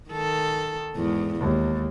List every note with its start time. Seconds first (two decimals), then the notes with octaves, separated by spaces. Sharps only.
0.10 D#3 A4
0.96 E2 G#2
1.40 D#2 G#3